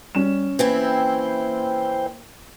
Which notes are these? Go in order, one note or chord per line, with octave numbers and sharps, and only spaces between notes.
G3 C#4 E7
E3 A#3 C4 E4 C5 G5